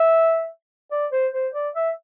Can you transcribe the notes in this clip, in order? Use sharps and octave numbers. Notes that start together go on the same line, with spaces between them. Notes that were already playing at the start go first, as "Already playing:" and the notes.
Already playing: E5
D5
C5
C5
D5
E5